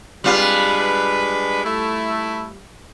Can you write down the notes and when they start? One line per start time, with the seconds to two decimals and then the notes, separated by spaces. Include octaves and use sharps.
0.24 G3 G#3 D4 F4 B4
1.64 A3 E4